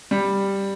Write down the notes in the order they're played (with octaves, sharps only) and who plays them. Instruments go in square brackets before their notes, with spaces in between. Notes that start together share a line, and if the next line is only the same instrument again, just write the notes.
[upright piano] G3